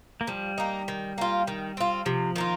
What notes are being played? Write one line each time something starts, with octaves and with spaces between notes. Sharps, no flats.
A#3
F3 G3
A#3 D#4
D#3
A#3 F4
D#3
C4 F4
C3 F3
D#3 A#3 F4